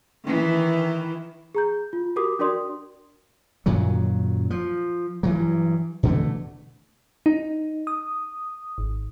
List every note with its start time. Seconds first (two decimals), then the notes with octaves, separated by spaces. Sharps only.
0.25 D#3 E3 E4
1.55 G#4 A#5 G6
1.93 F4
2.16 F#4 G4 A#4 D6 D#6
2.39 D4 F#4 A#4 D5 C6 D#6
3.66 F#2 A#2 D#3 F#3
4.50 F3
5.23 G2 E3 F#3
6.03 B2 D3 E3 A3
7.26 D#4
7.87 D#6
8.78 G#1